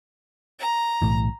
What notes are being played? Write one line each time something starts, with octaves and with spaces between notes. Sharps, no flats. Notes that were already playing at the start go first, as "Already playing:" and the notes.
A#5
B1 A2 E3